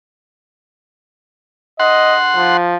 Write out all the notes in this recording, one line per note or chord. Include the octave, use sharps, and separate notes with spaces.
D#5 F#5 C6
F3